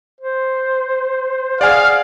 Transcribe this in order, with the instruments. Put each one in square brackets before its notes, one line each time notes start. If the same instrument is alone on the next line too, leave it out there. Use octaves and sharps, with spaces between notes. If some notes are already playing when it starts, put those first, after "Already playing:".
[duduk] C5
[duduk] G#4 [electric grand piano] D5 F#5 G#5 [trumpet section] F5